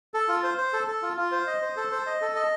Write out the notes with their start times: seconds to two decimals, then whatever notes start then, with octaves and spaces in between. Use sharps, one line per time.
0.14 A4
0.28 F4
0.43 C5
0.58 C5
0.73 A4
0.87 A4
1.02 F4
1.17 F4
1.32 C5
1.47 D#5
1.62 C5
1.77 A4
1.92 C5
2.06 D#5
2.21 A4
2.35 D#5